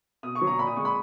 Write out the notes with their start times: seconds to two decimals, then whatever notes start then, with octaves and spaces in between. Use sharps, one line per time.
0.23 B2 D#6
0.35 C#6
0.41 F#3
0.47 A#5
0.59 A#2 B5
0.67 D#6
0.76 G#3 C#6
0.85 B5